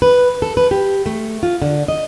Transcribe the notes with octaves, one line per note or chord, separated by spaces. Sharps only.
B4
A4
B4
G4
A3
F4
D3
D#5